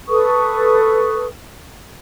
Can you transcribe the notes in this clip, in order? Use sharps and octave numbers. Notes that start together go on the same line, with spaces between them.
A4 B4 C#6 D#6